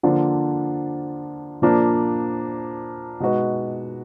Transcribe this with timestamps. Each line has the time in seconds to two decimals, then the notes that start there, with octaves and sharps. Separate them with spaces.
0.03 D3 F3 A#3 D4 F4
1.62 A#2 F3 A#3 D4
3.20 B2 G#3 D#4 F#4 B4